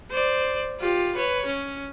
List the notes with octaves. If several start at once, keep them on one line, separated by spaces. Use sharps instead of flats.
C5 D5
F4 G4
B4 C#5
C#4